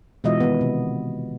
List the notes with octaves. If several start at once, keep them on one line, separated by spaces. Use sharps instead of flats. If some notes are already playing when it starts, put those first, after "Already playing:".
B2 E3 G#3 F4 D#5 E5
D#3 B3
C3